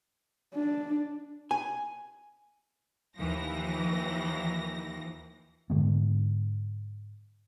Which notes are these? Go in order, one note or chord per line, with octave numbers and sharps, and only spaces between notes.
D4
G#5
D#2 E3 F3 A#6
G#2 D3 G#3 B3